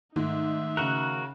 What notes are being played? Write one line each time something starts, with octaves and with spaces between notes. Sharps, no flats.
G#2 D#3 A3 D#4 E5
C#3 F#4 A#4 F#6